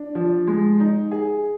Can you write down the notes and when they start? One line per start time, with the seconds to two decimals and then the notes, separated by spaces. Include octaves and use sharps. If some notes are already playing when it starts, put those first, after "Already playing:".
Already playing: D4
0.15 F3
0.47 G#3
0.80 D#4
1.12 G#4